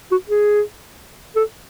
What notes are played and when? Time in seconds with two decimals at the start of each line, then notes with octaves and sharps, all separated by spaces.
0.11 F#4
0.29 G#4
1.36 A4